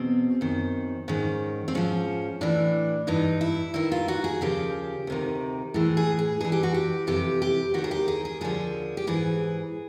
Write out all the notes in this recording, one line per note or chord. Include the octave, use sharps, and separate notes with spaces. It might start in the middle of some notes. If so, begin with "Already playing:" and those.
Already playing: E2 B2 C4
F#2 D#3
G#2 D#3 C#4
C4
G#2 F3 C#4
A2 E3 D4
G2 E3 D#4
E4
G2 D#3 E4
F4
F#4
G#4
D#2 C#3 F3 G4
D2 C3 D#3
A2 E3 G#4
G#4
G#4
G2 E3 G#4
G4
F#4
G4
F2 C3 E3 G4
G4
D#2 D#3 F#4
G#4
G4
G#4
G#4
D#2 D3 F3 G#4
G4
G#2 E3 G#4